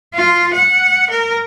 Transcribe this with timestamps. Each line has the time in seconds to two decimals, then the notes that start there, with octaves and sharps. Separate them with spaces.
0.14 F4
0.53 F#5
1.10 A#4